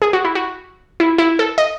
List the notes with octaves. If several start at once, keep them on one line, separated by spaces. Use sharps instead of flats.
G#4
F#4
E4
F#4
E4
E4
A4
D#5